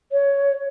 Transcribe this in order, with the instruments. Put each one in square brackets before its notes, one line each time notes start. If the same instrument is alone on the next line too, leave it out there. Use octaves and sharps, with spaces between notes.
[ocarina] C#5